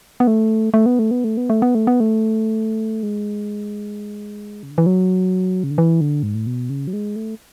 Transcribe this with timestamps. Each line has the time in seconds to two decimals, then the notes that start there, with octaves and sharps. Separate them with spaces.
0.20 B3
0.27 A3
0.74 A3
0.86 B3
0.99 A3
1.11 B3
1.24 A3
1.37 B3
1.50 A3
1.62 B3
1.75 A3
1.87 B3
2.00 A3
3.03 G#3
4.63 C#3
4.71 D3
4.78 E3
4.86 F#3
5.64 C#3
5.71 D3
5.78 E3
6.01 D3
6.23 G#2
6.35 A2
6.47 B2
6.70 C#3
6.87 F#3
6.93 G#3
7.16 A3